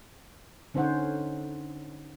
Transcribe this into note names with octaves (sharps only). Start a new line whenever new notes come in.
D3 C#4 D#4 C5 C#5 F#5